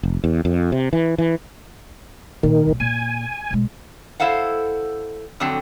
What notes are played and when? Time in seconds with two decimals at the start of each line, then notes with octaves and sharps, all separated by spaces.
0.03 F1
0.24 E2
0.45 F2
0.72 C3
0.93 E3
1.18 E3
2.43 A#2 D#3
2.66 F#2 A#2
2.80 A#2 G#5
3.51 B1 G#3
4.20 E4 A4 C5 F5 F#5
5.40 F2 D3 F#3 C4 G5